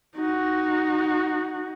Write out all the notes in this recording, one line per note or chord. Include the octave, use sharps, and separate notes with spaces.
D#4 F#4